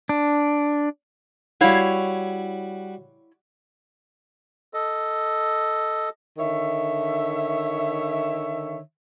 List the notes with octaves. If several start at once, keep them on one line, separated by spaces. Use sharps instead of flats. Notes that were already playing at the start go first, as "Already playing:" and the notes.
D4
G3 E4 F#4 C#5 F5
A4 D#5
D3 D#3 C#5 E5